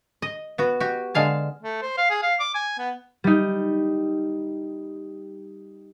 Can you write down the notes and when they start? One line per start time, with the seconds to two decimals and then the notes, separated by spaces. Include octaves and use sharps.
0.22 D#5
0.58 B3 F#4
0.80 F#4 G4
1.15 D3 G#3 F5 A5
1.62 A3
1.82 C5
1.98 F5
2.10 G#4
2.23 F5
2.40 D6
2.55 G#5
2.79 B3
3.24 G3 D#4